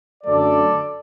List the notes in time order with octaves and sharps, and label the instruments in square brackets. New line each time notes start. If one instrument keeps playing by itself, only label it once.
[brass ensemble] F#2 D3 F#3 A3 A4 D5